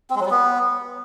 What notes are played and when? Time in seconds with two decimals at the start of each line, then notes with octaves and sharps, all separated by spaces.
0.10 C4
0.15 G#3
0.21 F#3
0.26 G3
0.31 B3